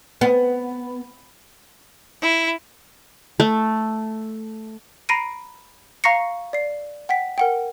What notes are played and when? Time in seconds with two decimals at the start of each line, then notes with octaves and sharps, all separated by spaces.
0.21 B3
2.21 E4
3.40 A3
5.09 A#5 B5 A#6 C7 D7 D#7
6.04 F5 A#5 C#6 A#6 C7 C#7
6.53 D5 C7
7.09 F#5 G5 B6
7.38 A#4 F#5 G5